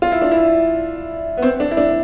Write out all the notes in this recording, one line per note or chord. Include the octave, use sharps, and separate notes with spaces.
F4
E4
D4
E4
B3
C4
D4
E4
D4